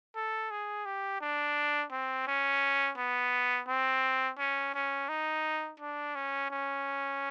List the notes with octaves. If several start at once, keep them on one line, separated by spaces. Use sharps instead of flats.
A4
G#4
G4
D4
C4
C#4
B3
C4
C#4
C#4
D#4
D4
C#4
C#4